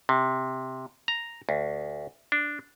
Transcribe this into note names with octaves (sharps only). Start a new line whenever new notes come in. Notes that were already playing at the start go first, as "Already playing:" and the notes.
C3
A#5
D2
D4